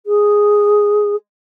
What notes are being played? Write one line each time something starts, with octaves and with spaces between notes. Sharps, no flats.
G#4